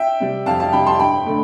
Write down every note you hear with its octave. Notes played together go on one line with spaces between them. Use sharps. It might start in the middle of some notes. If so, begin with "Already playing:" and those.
Already playing: E5 G5
C3 G3
F2 F5 A5
F5 A5
C3 G3 G5 B5
A5 C6
G2 G5 B5
D3 A3